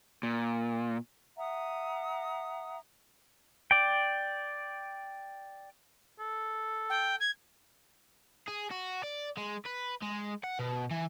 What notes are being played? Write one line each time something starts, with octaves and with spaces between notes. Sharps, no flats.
A#2
E5 F#5 A#5 D#6
D5 G5
A4
G5
G#6
G#4
F#4
D5
G#3
B4
G#3
F#5
B2
E3